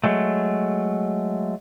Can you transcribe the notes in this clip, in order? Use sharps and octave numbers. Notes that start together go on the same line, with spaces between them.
F#3 G#3 A3